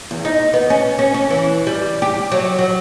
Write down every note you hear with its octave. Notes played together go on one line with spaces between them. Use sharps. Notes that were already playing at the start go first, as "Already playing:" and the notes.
E2
D#4
B3
C#4
C#4
C#4
E3
G3
G4
F#3
F#3